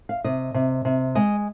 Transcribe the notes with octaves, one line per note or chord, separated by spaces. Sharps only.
F5
C3 D#5
C3
C3
G#3 D#5